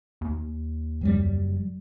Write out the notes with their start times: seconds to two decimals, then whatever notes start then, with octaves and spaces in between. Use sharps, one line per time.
0.21 D#2
1.01 F#1 F#3 G3